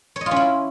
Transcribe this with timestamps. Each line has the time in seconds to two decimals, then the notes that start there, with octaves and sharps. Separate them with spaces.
0.16 C#5
0.21 D#5
0.26 F4
0.31 C#4
0.36 E4